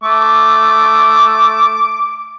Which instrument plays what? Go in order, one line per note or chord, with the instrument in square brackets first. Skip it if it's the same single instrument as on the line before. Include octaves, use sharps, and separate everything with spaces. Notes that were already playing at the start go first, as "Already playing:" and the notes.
[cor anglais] A3 [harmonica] D6